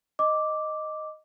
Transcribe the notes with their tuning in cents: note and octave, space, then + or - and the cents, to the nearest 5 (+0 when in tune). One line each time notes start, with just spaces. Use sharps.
D#5 +0 D6 -5